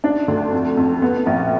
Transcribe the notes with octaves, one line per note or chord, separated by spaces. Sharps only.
D4
D2
F2
F2
B3
A#1